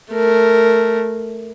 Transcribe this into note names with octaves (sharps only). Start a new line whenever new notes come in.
A3 A#4